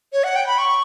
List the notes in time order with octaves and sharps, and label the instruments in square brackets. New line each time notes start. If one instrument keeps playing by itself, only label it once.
[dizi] C#5
F#5
G5
B5
C#6